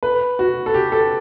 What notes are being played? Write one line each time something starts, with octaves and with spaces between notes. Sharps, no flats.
B4
F#4
A4
G4
A4